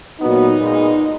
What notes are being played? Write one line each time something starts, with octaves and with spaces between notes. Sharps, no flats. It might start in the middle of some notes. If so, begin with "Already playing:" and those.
A#2 F#3 B3 D#4
A#2 G#3 B3